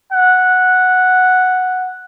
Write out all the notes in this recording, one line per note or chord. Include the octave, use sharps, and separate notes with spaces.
F#5